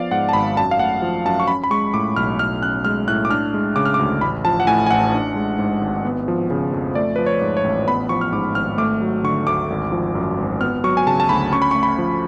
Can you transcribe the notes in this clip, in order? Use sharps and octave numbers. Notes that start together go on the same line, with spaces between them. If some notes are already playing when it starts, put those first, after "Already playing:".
Already playing: F3 B3 D5 F5
G#2 F#5
A5
G#1 B5
F#2 A5
F5
A3 F#5
F3
F#2 A5
C#6
C#4 B5
B5
G#3 C#6
A2 D6
B1 F6
A2 F6
C#4 F#6
G#3 F6
A2 F#6
D6
D4 F6
G#3
C#3 D6
F6
D6
D2
A1 B5
F3 A5
F#5
A2 G#5
G#5
A1 F#5
D4
G#3
G#2
G#1
B3
F3
C#3
F2
A3 D5
F3 B4
C#5
G#2
C#5
A1
B3 B5
F3 C#6
F6
G#2 D6
G#1 F6
A3 D6
F#3
D3 C#6
D2 D6
G#1
F3
F#2
G#1
B3 F6
F#3 C#6
G#5
C#3 A5
A5
D2 B5
C#4 C#6
B5
C#6
A3
B5
F3